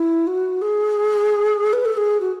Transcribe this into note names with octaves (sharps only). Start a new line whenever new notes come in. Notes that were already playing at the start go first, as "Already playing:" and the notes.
Already playing: E4
F#4
G#4
B4
A4
G#4
F#4